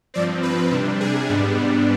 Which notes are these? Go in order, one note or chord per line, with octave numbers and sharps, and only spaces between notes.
G2 F3 C4 D5
B4
C3 G3 D4
G#4
G#2 G3 B3 D4